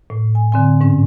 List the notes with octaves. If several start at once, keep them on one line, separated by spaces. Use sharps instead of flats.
A2
G#5
D3 C4 G#5
G#2 C#4